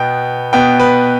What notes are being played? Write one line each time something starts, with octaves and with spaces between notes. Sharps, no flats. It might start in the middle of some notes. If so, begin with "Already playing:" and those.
Already playing: B2 B3 G5
B2 B3 G5
B4